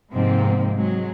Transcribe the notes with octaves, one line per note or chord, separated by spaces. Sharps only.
G#2 C3 F3 A#3 C4
F#3 G#3